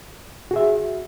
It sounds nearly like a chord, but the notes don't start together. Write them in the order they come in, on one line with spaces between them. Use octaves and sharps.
F#4 G#4 E5